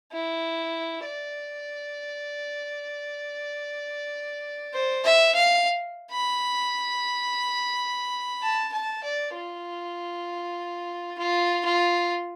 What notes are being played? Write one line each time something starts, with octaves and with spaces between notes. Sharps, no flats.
E4
D5
C5
E5
F5
B5
A5
A5
D5
F4
F4
F4